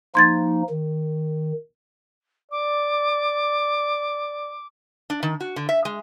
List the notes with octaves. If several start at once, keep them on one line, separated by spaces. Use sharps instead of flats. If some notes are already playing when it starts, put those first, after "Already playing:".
F3 A#3 D#4 C6 G#6 A6
D#3
D5 D6
D4
D#3
F#4
D3
E5
G#3